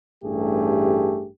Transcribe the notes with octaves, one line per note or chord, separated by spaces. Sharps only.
A1 G2 A3 G4 G#4